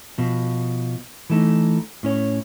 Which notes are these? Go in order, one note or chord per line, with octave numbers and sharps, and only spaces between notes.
B2 F3
E3 A3 D#4
A2 C#4 C#5